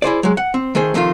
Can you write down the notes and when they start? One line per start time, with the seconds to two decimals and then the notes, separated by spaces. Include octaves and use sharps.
0.02 E4 G#4 C5 D5
0.23 F#3 G#3
0.37 F#5
0.54 C4
0.75 D#3 A3 G#4 C5
0.94 F2 C3 D#3 A3 F4